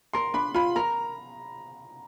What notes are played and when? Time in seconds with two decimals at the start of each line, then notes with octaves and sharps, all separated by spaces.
0.13 A#4 C6
0.34 D4 B5
0.54 F4 B5
0.76 A#4 A#5